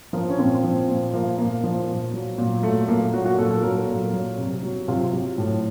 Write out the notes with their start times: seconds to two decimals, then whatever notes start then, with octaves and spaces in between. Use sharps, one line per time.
0.13 F3 A#4
0.30 C#4
0.39 A#2 C4
0.64 F3
0.88 A#2
1.13 F3 A#3
1.38 A#2 A#3
1.64 F3
1.88 A#2
2.14 F#3
2.38 A#2
2.63 F#3 A3
2.88 A#2 A#3
3.13 F#3 F#4
3.25 F#4
3.38 A#2 A4
3.51 A4
3.63 F#3 A#4
3.88 A#2
4.13 F#3
4.38 C3
4.63 F#3
4.88 C3 F4
5.13 F#3
5.38 A2